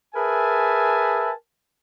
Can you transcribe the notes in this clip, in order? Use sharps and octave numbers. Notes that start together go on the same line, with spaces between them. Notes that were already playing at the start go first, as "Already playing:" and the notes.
G#4 A#4 B4 E5 G#5 A5